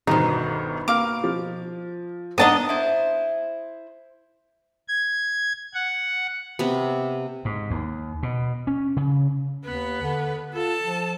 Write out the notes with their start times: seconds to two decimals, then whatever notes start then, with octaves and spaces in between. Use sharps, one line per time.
0.07 G1 B2 D#3 D#4 C5
0.88 A#3 F5 D6 F6
1.24 F3
2.38 B3 D4 D#4 D#5 A5 D#6
2.69 E4 C5
4.88 G#6
5.74 F#5
6.59 C3 B3
7.45 G#2
7.71 D#2
8.23 B2
8.67 C#4
8.97 C#3
9.65 D#2 B3 B4
10.01 D3
10.53 F4 A4 A5
10.83 F3